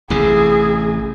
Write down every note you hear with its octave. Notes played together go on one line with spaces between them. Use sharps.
A1 A2 C3 G#4